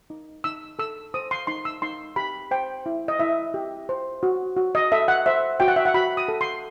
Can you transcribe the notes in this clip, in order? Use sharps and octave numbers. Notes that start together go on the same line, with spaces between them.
D#4
D#4 E6
A4 E6
C5 D#6
C6
D#4 C6
E6
D#4 C6
G4 B5
C5 G5
E4
D#5
E4 E5
G4
C5
F#4
F#4
D#5
A4 E5
F#5
C5 E5
F#4 G5
F#5
E5
F#5
F#4 B5
D#6
A4
C6